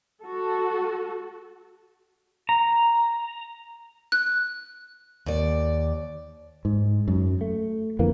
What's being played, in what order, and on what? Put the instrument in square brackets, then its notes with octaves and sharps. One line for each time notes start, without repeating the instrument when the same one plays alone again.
[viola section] F#4 A4
[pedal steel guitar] A#5
[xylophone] F#6
[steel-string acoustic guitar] D#2 D5
[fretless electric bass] G#2
F#2
A3
F2 D3 E3 A#3